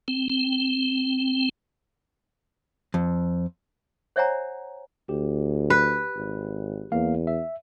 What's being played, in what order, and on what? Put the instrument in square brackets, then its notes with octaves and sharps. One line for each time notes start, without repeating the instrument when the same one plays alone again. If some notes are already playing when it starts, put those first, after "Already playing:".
[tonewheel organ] C4
C4
[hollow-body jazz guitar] F2
[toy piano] C5 C#5 E5 F#5 G#5 A#5
[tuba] D2 [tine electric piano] G4
[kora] B4
[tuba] G#1
[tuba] E2 [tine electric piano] A#3 F5
[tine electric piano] E5